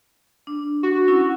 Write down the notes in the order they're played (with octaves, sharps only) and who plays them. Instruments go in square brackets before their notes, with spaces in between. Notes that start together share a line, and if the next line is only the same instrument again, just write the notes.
[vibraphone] D4
[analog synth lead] F#4
[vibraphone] C#4 E4